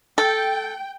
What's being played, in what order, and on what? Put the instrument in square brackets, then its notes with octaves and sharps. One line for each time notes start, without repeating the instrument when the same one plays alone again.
[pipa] A4 [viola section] G5